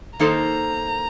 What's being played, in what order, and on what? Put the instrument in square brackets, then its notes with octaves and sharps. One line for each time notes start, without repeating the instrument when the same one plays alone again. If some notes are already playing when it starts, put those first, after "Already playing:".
[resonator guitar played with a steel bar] D#3 A#3 D#4 A4 C5 [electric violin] A#5